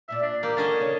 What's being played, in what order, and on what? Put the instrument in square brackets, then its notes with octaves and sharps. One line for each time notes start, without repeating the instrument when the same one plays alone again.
[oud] F#2 A#2 D5 [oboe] E5
[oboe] D4
[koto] A#3 [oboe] G4
[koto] D3 C#4 D#5 [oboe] A5
[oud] C#3 F#3 C#5